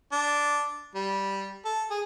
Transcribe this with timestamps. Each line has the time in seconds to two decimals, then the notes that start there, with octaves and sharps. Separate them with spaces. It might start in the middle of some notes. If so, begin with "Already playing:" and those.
0.12 D4
0.95 G3
1.65 A4
1.90 G#4